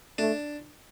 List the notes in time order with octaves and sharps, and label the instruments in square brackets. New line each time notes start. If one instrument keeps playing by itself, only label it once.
[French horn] A3 [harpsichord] D4